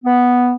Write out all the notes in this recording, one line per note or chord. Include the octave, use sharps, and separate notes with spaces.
B3